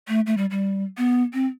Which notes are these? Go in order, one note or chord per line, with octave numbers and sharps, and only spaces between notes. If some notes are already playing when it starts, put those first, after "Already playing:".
A3
A3
G3
G3
B3
C4